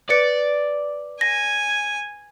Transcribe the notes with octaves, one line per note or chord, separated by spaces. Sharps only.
B4 D5 A6 C#7
G#5 A#6